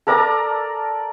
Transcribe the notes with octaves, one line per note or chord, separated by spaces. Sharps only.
A4 A#4 D5 A#5